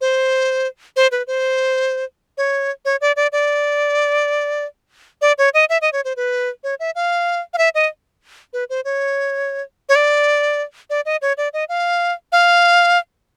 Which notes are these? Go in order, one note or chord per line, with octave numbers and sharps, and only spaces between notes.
C5
C5
B4
C5
C#5
C#5
D5
D5
D5
D5
C#5
D#5
E5
D#5
C#5
C5
B4
C#5
E5
F5
F5
E5
D#5
B4
C5
C#5
C#5
D5
D5
D#5
C#5
D5
D#5
F5
F5